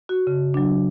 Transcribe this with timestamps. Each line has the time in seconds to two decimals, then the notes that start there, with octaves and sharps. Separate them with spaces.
0.09 F#4
0.27 C#3
0.54 F#3 D4